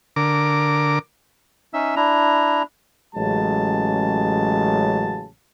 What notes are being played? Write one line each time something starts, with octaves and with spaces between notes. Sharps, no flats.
D3 A#4 D6
C#4 D#4 E5 E6
D4 E4 A#5
A1 C#3 F#3 G#3 A5